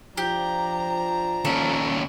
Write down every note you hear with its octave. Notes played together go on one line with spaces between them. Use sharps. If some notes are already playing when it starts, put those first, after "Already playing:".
F3 D4 G4 A#5
D#2 C#4 A4